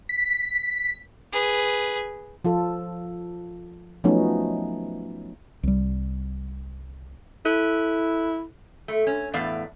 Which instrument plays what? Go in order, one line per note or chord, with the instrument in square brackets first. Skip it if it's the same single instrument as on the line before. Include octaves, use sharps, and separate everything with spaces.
[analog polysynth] B6
[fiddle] G#4 B4
[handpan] F3 F4 A4
F3 F#3 A3 B3 C#4 D#4
[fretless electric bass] C2 G3
[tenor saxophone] E4 [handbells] A4 F#6
[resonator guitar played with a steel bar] A3
C#4
E2 A2 B3 D5 F5